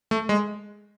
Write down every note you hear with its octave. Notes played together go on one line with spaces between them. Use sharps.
A3
G#3